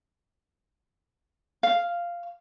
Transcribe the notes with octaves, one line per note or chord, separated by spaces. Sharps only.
F5